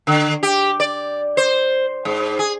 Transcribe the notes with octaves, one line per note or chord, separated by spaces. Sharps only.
D3
G4
D5
C5
G#2
G#4